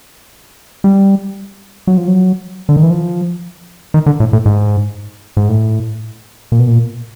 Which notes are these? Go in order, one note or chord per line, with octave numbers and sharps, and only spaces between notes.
G3
F#3
F3
F#3
D3
D#3
E3
F3
D#3
D3
A2
A2
G#2
G#2
A2
A#2
B2
A#2